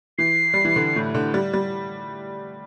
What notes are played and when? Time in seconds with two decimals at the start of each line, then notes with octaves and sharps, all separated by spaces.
0.18 E3 C7
0.54 G3
0.65 E3
0.76 D3
0.96 A2
1.15 D3
1.34 G3
1.53 G3